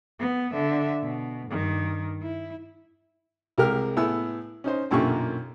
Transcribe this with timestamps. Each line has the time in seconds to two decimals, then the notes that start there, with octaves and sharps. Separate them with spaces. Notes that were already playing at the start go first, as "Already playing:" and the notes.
0.19 B3
0.52 D3 E5
1.03 B2
1.51 G2 D#3
2.22 E4
3.58 C2 G#3 G4 A#4 F6
3.97 A2 B3 E4 G#4 E6
4.64 C#4 D#4 C5
4.91 B1 F#2 A#2 D3 G4 C#6